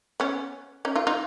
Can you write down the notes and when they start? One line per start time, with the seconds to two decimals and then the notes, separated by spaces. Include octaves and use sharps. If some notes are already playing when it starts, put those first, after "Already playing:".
0.20 B3 C#4
0.85 C#4 D#4
0.95 D#4 F4
1.07 D#4 F4